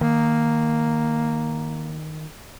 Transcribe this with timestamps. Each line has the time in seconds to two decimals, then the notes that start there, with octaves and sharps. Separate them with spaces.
0.01 D#3 A#3